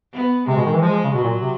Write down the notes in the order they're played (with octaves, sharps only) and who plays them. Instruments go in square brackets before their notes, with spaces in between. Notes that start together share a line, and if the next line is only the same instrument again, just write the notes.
[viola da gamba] B3
[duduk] C3 [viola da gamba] G#3
[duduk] B2
D#3
E3
[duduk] F3 [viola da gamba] G#3
[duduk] F3
C#3
[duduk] B2 [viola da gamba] F#3
[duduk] A#2
C3